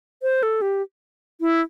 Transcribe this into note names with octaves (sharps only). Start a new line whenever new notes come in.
C5
A4
G4
E4